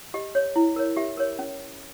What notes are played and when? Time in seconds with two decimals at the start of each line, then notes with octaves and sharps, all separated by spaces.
0.14 G4 D#5
0.35 C#5
0.56 E4
0.76 A#4 C#5
0.97 G4 E5
1.17 A#4 C#5
1.39 C#4